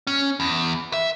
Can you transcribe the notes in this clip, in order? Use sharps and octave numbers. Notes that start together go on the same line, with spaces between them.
C#4
E2
E5